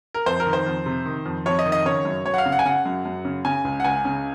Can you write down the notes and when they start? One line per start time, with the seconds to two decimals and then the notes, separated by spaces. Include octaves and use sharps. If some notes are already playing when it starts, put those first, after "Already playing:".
0.14 A#4
0.26 F2 C5
0.40 A#4
0.46 D#3
0.53 C5
0.66 F2
0.86 C3
1.06 D#3
1.26 F2
1.46 F2 C#5
1.59 D#5
1.66 D#3
1.72 D#5
1.85 C#3 C#5
2.05 F#2
2.25 F#2 C#5
2.34 F#5
2.38 F5
2.45 C#3
2.52 F#5
2.59 G#5
2.65 C#3 F#5
2.86 F#2
3.05 F#2
3.25 C#3
3.45 C#3 G#5
3.65 C#2
3.80 F#5
3.84 C#2 G#5
4.05 C#3